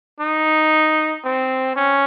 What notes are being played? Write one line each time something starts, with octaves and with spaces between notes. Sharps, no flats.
D#4
C4
C#4